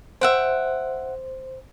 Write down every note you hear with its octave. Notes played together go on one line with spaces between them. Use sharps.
C5 E5 F#5 G5